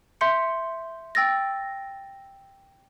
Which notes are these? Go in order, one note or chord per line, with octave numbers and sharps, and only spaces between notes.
E5 C6 G6 C#7
G5 E6 A6 A#6